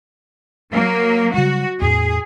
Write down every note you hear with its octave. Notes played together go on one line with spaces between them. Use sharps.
F#3 A#3
C#3 G3 F#4
E2 A2 G#4